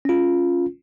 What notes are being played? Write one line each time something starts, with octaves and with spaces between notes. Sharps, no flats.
C#4 F4